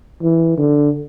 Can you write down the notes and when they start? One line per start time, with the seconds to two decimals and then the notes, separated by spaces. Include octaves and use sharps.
0.22 E3
0.58 D3